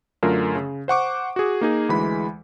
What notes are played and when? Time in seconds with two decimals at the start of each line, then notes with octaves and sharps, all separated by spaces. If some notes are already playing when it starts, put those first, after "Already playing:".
0.23 F#2 D3 A3 F4 A#4
0.56 C#3
0.88 C5 F#5 C#6 D6
1.36 F#4 G#4
1.61 A#3 D#4 G#4
1.89 D2 E3 G#3 B5